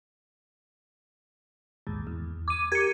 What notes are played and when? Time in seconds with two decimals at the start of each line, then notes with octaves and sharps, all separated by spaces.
1.87 A#1 D#2 G#2
2.07 E2
2.48 D6 D#7
2.72 G4 A#4 D6 G#6 C#7